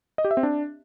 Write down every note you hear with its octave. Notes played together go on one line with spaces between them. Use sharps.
D#5
G4
E5
C4
D4